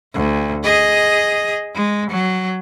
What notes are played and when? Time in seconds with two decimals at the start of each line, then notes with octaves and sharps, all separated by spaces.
0.14 D2
0.64 G#4 D#5
1.75 G#3
2.11 F#3